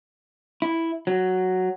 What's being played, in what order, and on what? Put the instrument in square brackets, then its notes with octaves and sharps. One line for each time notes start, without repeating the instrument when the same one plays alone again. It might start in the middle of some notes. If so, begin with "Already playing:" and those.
[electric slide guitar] E4
F#3